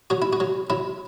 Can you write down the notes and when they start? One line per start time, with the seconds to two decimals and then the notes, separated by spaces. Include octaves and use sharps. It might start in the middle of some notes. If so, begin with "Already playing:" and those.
0.10 F#3 F#4
0.22 E4
0.33 F#4
0.40 F#3
0.70 F#3 E4